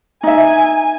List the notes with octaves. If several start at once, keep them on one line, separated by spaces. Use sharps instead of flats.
D#4 E5 G#5